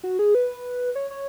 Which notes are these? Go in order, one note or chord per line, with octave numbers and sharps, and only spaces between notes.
F#4
G#4
B4
C#5
C#5